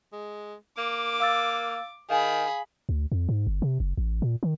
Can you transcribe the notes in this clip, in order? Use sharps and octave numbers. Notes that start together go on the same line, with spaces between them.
G#3
A#3 D6
F5 E6 A6
D#3 G#4 F5 G#5 B5
D2
F2
G#2
G1
C3
F#1
A1
A#2
D#3